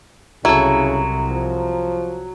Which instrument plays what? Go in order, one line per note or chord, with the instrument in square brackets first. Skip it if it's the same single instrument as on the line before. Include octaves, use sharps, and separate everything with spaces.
[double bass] C2 [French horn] C#3 [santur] F#3 [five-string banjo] E4 A4
[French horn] F3